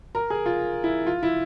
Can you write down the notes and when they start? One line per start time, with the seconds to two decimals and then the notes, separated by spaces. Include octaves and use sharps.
0.15 A#4
0.30 G#4
0.46 F4
0.84 E4
1.07 F4
1.23 E4